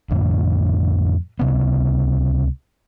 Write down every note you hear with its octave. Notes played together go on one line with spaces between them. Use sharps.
F2 A2 D3
C#2 C3 B3